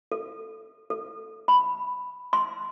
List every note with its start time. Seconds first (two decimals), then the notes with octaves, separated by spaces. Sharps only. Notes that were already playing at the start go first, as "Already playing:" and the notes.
0.12 A4
0.90 A4
1.48 B5
2.33 C6